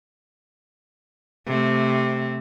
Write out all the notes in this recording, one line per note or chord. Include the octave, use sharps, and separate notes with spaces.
C3 A3 C4